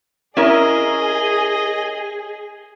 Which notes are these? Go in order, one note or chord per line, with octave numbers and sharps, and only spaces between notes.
C#4 E4 G#4 A#4 D#5